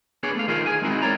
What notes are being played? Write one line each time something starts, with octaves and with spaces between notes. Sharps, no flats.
B3 D4 G#4 C#5 D5
A3 F5
D#3 F4 G#4 A#4 C5
G#4 G#5
G#3 C4 D#4 E4 F#4
A#4 C#5 D5 A#5